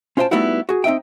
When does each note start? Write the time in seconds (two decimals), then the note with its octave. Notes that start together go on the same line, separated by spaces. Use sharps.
0.17 C#4 F4 C5 E5 G5 A5
0.31 G3 A3 B3 D#4 E4 F#4
0.69 F#4 G#4
0.84 C4 D#4 D#5 E5 G5